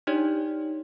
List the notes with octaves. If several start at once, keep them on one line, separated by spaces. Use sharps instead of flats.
D4 D#4 G4 C#5 D5